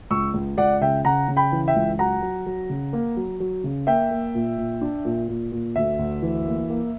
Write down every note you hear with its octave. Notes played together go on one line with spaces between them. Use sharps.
C#2 C#6 E6
C#2
C#2 D5 F#5
C#3 E5 G5
C#3 F#5 A#5
C#3
G5 B5
E3
E5 G5
C#2
F#3 F#5 A#5
F#3
F#3
C#3
A#3
F#3
F#3
C#3
A#3 E5 G5
A#3
A#2
A#2
D4
A#2
A#2
A#2
D2 E5
D2
E3
A#3
A#3